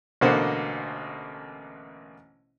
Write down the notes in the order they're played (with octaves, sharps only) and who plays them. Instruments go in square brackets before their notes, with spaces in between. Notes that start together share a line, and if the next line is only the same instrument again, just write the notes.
[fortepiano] A1 B2 D3 A#3 C5 F#5